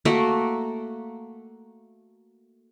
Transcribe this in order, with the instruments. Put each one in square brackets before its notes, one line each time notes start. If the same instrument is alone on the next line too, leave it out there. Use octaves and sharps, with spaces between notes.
[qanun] A3 A#3 F#4 E5